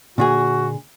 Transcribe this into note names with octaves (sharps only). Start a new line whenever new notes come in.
A#2 D3 F#4 G#4